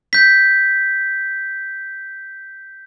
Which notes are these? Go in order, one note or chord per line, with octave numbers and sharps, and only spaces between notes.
G6 B6